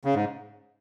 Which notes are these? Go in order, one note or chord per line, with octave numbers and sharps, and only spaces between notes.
C#3
G#2